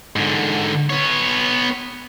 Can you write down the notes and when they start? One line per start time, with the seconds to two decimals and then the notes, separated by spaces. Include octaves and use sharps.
0.16 G#2 D3
0.90 B3 C#5